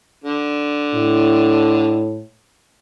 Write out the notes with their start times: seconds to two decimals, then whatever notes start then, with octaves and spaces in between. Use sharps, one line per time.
0.24 D3
0.94 A2